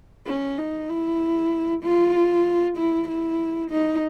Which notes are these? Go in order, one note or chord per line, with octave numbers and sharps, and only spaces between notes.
C#4
D#4
E4
F4
E4
E4
D#4